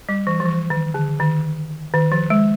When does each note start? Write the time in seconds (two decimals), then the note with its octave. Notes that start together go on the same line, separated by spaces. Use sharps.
0.09 G3
0.27 E3
0.40 F3
0.46 E3
0.70 D#3
0.94 D3
1.20 D#3
1.94 D#3
2.12 F3
2.30 G#3